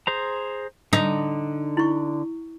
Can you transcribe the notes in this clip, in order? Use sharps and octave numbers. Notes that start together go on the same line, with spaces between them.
G#4 C5 A#5
D3 D#4
E4 C#6